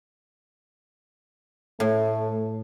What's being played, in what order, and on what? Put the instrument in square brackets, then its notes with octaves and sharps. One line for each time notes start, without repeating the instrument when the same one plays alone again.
[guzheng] A2 [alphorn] A3